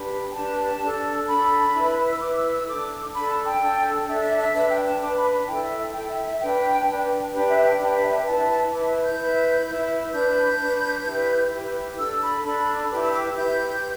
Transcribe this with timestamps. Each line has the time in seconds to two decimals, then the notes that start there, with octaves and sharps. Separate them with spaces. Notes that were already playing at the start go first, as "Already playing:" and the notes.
Already playing: D4 G4 B4
0.31 G5
0.35 D4 G4 B4 A5
0.82 D4 A4
1.28 D4 A4 B5
1.75 E4 B4
2.11 E6
2.21 E4 B4 D6
2.36 E6
2.52 E6
2.68 D4 A4 D6
3.14 D4 A4 B5
3.29 A5
3.45 G5
3.61 D4 A4
4.07 D4 A4 E5
4.22 E5
4.38 E5
4.53 D4 B4 E5
4.69 G5
4.85 A5
5.00 D4 B4 D6
5.16 B5
5.47 E4 A4 G5
5.63 E5
5.78 E5
5.93 E4 A4 G5
6.09 E5
6.25 E5
6.40 D4 B4 G5
6.87 D4 B4
7.33 D4 G4 B4
7.49 E5
7.64 G5
7.79 D4 G4 B4 G5
8.02 E5
8.17 G5
8.26 E4 B4 A5
8.72 E4 B4 D6
9.04 G6
9.19 E4 B4
9.65 E4 B4
10.12 D4 B4 G6
10.59 D4 B4
11.05 E4 G4 B4
11.52 E4 G4 B4
11.98 D4 A4 E6
12.22 B5
12.45 D4 A4 B5
12.91 E4 G4 B4 D6
13.01 E6
13.12 D6
13.38 E4 G4 B4 G6